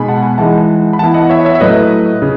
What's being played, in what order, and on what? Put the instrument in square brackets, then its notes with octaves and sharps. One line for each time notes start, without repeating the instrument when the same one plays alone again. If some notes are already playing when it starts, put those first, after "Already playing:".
Already playing: [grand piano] B2 G#3 D#4 [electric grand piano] G#5 B5
[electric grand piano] F#5 A5
G#5 B5
[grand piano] E3 G#3 D#4 [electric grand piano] F#5 A5
[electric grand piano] B5
[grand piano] E3 B3 E4 [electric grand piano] F#5 A5
[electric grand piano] D#5 F#5
C#5 E5
C#5 E5
E5
[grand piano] A2 F#3 A3 [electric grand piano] B4 D#5
[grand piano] C#3